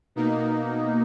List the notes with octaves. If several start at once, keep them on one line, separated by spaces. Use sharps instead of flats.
B2 A#3 D#4